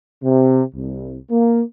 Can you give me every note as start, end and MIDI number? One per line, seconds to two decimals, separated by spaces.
0.23 0.61 48
0.74 1.17 36
1.31 1.61 58